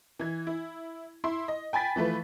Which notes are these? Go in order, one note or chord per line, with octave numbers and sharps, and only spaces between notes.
E3 G#6
E4
E4 C6
D#5
G5 G#5 B5 A6 B6
E3 F3 A3 B4